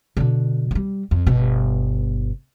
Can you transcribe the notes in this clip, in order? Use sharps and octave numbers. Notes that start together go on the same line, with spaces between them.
B2 D3
F#3 G3
F2
G1 B2